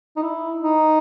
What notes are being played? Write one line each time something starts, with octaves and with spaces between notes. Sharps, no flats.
D#4
E4
D#4